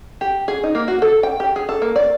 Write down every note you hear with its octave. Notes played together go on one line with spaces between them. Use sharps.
G4
G#4
D#4
A#3
F#4
A4
G5
G4
G#4
A4
A#3
D5